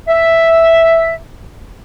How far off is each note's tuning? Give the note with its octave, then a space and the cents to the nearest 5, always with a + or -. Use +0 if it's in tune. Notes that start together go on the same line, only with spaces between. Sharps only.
E5 +0